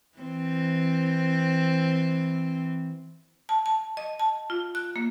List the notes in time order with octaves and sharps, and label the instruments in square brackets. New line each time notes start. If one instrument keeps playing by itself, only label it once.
[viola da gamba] E3 C4
[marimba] A5
A5
D#5
A5
F4
F#6
A#3